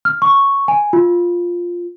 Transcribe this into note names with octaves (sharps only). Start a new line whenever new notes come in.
F6
C#6
G#5
F4